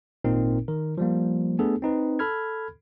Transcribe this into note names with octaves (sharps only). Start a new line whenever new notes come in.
G#1 A#2 C4 D#4 A#4
D#3 A#4
F3 G3 A#3
A3 B3 D4 G#4 A4
C4 D#4 B4
A4 B5 F6 G#6